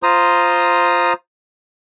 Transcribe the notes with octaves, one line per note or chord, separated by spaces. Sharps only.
F4 C5 A#5 D#6